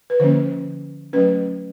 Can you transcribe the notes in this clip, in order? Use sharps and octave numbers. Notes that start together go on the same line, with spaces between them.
B4
D3 F3 A#3 C#4 C5
F#3 A3 C#4 B4